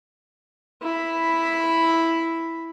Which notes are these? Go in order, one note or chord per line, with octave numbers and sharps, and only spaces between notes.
E4 B5